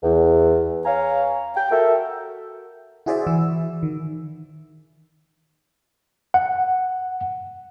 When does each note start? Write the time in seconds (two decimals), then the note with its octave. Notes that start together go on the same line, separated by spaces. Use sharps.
0.03 E2
0.86 C#5 F5 G#5 A#5
1.56 G5
1.71 F#4 A4 A#4 E5
3.06 E4 F#4 G#4 C5 D5 E5
3.27 E3 E4 E6
3.83 D#3
6.34 F#5